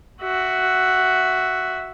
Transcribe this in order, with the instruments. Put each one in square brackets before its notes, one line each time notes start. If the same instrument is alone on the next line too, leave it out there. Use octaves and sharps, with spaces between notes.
[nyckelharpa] F#4 E5